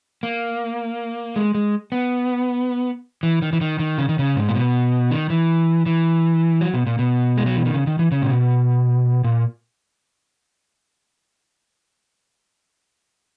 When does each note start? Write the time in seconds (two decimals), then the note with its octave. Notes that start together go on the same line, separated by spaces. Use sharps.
0.23 A#3
1.36 G#3
1.54 G#3
1.92 B3
3.23 E3
3.42 D#3
3.53 E3
3.61 D#3
3.79 D#3
3.98 C#3
4.09 D#3
4.19 C#3
4.36 G#2
4.49 A#2
4.55 B2
5.11 D#3
5.30 E3
5.86 E3
6.61 F#3
6.74 B2
6.87 A#2
6.99 B2
7.37 G#3
7.46 F#3
7.56 E3
7.65 D#3
7.74 C#3
7.87 D#3
7.99 E3
8.12 C#3
8.22 A#2
8.30 B2
9.24 A#2